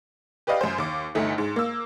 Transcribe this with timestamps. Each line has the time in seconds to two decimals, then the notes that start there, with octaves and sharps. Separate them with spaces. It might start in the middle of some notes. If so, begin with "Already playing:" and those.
0.47 G4 B4 D5 D#5 F5
0.61 F#2 C5
0.78 D#2 D6
1.15 G1 D2 A3 D#4
1.38 G#2
1.56 A#3 E6